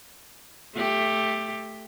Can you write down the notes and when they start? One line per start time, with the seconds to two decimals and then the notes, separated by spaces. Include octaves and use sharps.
0.75 A3 G4